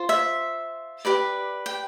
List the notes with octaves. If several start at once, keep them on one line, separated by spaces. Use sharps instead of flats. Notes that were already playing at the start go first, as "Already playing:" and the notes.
Already playing: F4 C5
E5
G4 B4 D5
G5